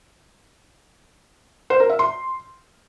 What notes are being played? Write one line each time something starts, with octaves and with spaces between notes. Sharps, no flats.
C5
A#4
E5
C6